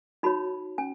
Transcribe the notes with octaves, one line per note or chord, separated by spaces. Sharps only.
D#4 F#4 C#5 B5
C#4 G#5